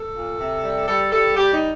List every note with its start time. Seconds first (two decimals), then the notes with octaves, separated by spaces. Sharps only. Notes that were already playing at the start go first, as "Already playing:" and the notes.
Already playing: A4
0.13 A#2
0.37 C3
0.63 G3
0.87 G3 A4
1.11 G3 A4
1.36 G3 G4
1.52 D#4